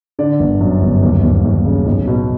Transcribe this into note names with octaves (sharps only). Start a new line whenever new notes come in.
D3 D5
G1
F#2
G1
D#2
D#2
D#2
C#3
B1
B2